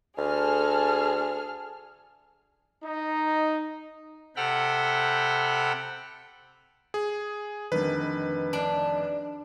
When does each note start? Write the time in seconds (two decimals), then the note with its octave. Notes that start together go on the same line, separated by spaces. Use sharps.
0.18 D2 G#4 A4 F6
2.84 D#4
4.36 C3 A4 F#5 G5 B5 F6
6.94 G#4
7.72 F1 D3 D#3 B4
8.53 D4